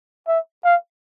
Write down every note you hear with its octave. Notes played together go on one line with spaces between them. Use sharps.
E5
F5